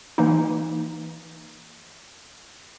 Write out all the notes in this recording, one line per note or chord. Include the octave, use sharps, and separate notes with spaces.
E3 A#3 D#4